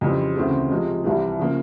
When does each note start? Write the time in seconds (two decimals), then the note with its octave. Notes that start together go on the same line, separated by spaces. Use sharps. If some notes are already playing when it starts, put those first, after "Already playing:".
0.01 F2 C#3 E3 G3 C4
0.36 D2 C#3 E3 A3 C4
0.69 C3 F3 G#3
1.03 C2 C3 E3 G3
1.38 C#3 F3 A#3